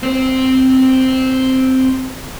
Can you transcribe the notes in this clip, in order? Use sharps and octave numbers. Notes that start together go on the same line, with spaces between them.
C4 C5